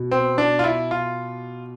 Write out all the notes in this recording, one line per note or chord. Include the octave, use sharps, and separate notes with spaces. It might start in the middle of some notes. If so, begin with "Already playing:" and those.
Already playing: B2
C4
D4
F4
E4
F4